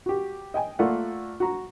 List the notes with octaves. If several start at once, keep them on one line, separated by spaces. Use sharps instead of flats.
F#4 G4
D#5 G5 G#5
A3 A#3 F4 D5 F#5
F#4 A#5